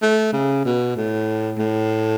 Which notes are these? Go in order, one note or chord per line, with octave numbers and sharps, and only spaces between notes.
A3
C#3
B2
A2
A2